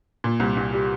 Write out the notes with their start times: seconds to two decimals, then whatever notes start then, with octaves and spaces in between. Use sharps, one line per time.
0.24 A#2
0.40 C2
0.57 C2
0.73 G3